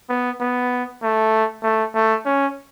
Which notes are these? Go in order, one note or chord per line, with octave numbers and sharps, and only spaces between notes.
B3
B3
A3
A3
A3
C#4